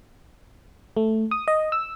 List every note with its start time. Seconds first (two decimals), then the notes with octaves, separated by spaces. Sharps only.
0.97 A3
1.31 D#6
1.48 D#5
1.72 E6